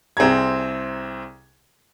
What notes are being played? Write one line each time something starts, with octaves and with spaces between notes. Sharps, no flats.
C2 C4 G#4 A#5 G#6